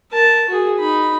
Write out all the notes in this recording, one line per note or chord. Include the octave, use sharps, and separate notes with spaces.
A#4 A5
F#4 G#4
D#4 B5